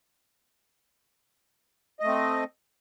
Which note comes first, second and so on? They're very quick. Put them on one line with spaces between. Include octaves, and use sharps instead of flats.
D#5 A3 C4